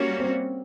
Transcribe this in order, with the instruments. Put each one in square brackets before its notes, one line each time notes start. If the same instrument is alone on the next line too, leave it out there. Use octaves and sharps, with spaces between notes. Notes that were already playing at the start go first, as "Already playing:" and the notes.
Already playing: [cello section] G3 A#3 C#4 F#4
[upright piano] C4